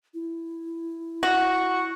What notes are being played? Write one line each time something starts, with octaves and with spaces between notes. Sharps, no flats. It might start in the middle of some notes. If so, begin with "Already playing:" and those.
E4
F#4 C#6